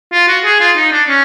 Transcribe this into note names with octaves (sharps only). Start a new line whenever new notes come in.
F4
F#4
G#4
F4
D#4
D4
C#4